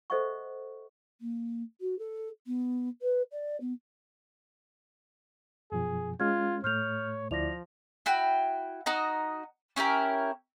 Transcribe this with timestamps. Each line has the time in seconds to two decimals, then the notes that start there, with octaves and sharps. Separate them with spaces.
0.10 A4 C5 D#5 E5 F#5 C#6
1.21 A#3
1.80 F#4
1.98 A4
2.46 B3
3.02 B4
3.32 D5
3.60 B3
5.72 F#2 B2 F3 G#4
6.20 G#3 C#4 F4 F6 G#6
6.64 A2 A3 C#5 F6 G6 F7
7.31 D2 F3 E4 D5 A#6 F7
8.06 E4 F#4 G5
8.86 D#4 F#4 D#5 A#5
9.76 C#4 E4 G4 A#4